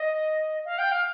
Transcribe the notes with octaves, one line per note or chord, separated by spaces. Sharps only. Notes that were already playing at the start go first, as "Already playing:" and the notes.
Already playing: D#5
F5
G5
F5